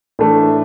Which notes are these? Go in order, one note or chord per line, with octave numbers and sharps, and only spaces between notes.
A2 E3 A3 D4